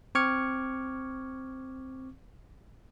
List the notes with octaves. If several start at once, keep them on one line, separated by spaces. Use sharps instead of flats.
C4 C#6 D6 F6 G#6 C#7